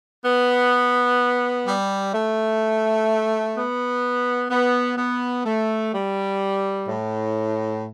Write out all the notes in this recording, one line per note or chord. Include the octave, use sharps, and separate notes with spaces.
B3
G3
A3
B3
B3
B3
A3
G3
A2